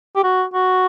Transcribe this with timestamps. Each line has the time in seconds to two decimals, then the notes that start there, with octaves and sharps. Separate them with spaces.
0.16 G4
0.24 F#4
0.54 F#4